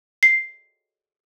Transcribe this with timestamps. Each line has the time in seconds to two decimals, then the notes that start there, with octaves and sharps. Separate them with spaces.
0.23 C7